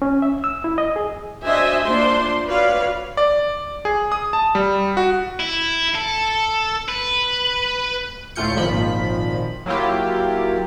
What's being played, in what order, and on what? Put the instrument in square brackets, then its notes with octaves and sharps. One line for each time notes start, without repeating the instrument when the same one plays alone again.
[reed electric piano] C#4
E5
E6
E4
D#5
G#4
[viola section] D4 F#4 C5 D#5 E5 G#5
A#3 D4 F4 C5 C6
F#4 B4 C#5 D5 F5
[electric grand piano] D5
G#4
D#6
A5
G3
F#4
[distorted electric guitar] E4
A4
B4
[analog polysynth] D2 A2 A3 F4 G6 C#7
G#1 A#2 D#3 F3 B5
F#3 A#3 E4 F4 G4